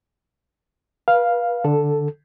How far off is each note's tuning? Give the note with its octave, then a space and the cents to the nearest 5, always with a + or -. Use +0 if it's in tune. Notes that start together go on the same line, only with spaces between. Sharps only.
B4 -35 F5 +0
D3 +0 A4 +0